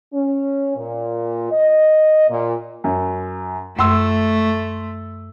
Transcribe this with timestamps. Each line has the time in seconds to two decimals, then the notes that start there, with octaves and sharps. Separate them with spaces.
0.12 C#4
0.75 A#2
1.51 D#5
2.28 A#2
2.84 F#2
3.79 F#2 A3 C6 E6